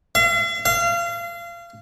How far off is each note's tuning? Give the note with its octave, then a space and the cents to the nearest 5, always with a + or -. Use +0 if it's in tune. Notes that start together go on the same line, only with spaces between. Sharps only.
F5 -45
F5 -30